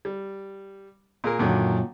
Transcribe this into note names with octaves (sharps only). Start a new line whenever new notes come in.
G3
A#2 G#4 A#4
F#2 A#2 D3 D#3 F#3